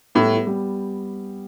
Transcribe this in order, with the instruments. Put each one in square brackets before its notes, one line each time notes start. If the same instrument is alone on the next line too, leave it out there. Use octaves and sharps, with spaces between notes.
[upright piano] A2 [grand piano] G3 B3 G4
[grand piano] G3 B3 G4